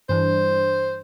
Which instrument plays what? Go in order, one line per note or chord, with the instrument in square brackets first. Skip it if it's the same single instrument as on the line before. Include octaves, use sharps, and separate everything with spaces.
[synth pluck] G2 E3 G3 D4 [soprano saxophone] C5